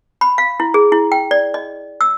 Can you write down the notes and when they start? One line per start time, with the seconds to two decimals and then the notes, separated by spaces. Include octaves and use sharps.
0.21 B5
0.38 F5
0.60 E4
0.74 G#4
0.92 E4
1.12 G5
1.31 D5
1.54 D#5
2.01 E6